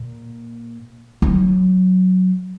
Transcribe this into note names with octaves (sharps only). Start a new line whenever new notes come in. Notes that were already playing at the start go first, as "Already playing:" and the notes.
Already playing: A#2
F#3